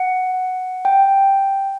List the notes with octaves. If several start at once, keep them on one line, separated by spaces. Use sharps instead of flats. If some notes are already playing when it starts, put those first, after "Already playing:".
Already playing: F#5
G5